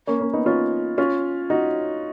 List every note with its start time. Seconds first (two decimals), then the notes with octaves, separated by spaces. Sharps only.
0.07 A#3 C#4
0.20 A#3 C#4
0.33 B3 D#4
0.46 C#4 F4
0.98 C#4 F4
1.50 D#4 F#4